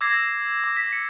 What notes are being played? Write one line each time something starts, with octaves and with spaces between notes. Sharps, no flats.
D6 E6 G#6 A#6 C7
D6
B6
C#7